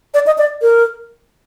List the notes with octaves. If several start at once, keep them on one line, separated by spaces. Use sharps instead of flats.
D5
D#5
D5
A#4